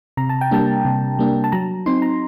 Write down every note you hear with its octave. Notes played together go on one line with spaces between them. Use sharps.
C3 A#5
A5
G5
G3 A#3 D4 A5
C3
G3 A#3 D4
A5
F#3 A#5
C4 D#4 C6
A#5